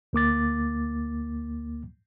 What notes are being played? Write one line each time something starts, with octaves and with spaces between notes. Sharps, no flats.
D2 A#3 D6 A6